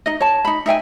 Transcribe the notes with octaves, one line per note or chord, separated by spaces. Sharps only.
D#4 D#5
C#5 A5
D#4 B5
D#4 E5 G5 G#5